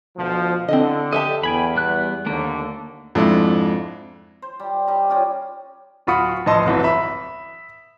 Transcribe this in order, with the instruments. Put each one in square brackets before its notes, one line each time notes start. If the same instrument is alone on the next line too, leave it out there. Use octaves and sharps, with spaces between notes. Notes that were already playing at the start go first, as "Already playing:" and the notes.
[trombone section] D2 B2 F3
[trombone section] D3 [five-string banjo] C4 E4 D#5
[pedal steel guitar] G4 D#5 [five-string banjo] A4 E5 A5
[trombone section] E2 [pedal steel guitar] G5 G#5 B5
[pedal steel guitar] G3 B3 F#6
[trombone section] D#2 D3 [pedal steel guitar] A3 A#3
[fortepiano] F2 G#2 D4 E4
[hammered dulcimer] C5
G3
G3 D#4
C#4 F4 G4 G#4
[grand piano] D1 F4 F#4 B5 D#6 C#7
A#1 A2 E3 D#5 A5 C6
G1 C2 E3 F#3
E5 B5